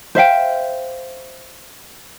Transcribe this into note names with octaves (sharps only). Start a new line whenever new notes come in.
C5 E5 F5 G5